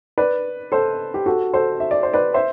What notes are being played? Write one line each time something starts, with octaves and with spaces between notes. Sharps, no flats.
B4 D5
A4 C5
G4
F#4 A4
A4 C5
E5
D5
C5
B4 D5
C5 E5